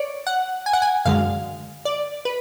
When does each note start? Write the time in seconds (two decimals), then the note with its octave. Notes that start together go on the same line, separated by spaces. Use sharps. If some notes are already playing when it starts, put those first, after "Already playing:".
Already playing: C#5 D5
0.27 F#5
0.66 G#5
0.73 F#5
0.82 G#5
1.05 F#2 D3 G#3 F5
1.85 D5
2.25 B4